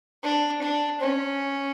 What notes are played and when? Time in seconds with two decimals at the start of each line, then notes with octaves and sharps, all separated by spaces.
0.23 D4
0.62 D4
1.00 C#4